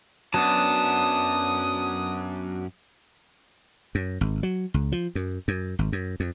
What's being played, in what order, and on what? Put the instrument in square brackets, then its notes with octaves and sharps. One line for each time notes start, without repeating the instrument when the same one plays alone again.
[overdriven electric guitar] F#2 [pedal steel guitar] F#3 B3 D4 [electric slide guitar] A5 [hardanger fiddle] D#6
[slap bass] F#2
G#1
F#3
C#2
F3
F#2
F#2
G#1
F#2
F2